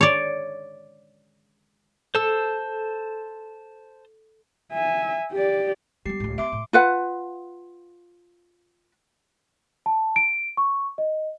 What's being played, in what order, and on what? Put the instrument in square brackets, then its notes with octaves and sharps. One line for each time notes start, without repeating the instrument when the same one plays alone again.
[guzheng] C#5 D5
[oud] A4 [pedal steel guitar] C5 A5 E6
[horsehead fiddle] E5 G#5
G4 D5
[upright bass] G3 B3 [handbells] G4 C7
[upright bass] C#2 A2
[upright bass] B3 [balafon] E5 [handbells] C6 D6 D7
[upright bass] A2
[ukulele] F4 B4 F#5
[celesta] A5
D7
C#6
D#5